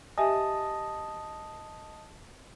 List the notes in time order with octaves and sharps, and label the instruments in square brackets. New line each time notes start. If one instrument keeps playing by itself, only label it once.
[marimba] G4 E5 G#5 [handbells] D#5 A5 D#6